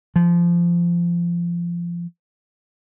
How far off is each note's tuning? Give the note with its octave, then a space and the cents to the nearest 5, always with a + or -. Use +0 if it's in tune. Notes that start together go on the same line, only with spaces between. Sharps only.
F3 -20